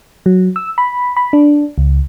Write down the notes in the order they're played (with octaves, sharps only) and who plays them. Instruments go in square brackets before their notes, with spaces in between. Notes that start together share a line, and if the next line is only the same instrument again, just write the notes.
[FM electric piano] F#3
E6
B5
B5
D4
C#2